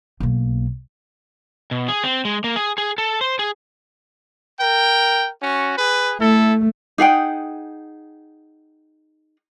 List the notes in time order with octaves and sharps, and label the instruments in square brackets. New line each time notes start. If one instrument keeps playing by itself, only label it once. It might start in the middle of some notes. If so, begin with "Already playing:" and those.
[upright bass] B1 A#3
[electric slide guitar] B2
G#4
C4
G#3
A#3
G#4
G#4
A4
C5
G#4
[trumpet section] A#4 G5
C#4 F#4
G#4 B4
[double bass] A3 [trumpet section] E4 A4
[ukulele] D#4 G#4 F#5 G5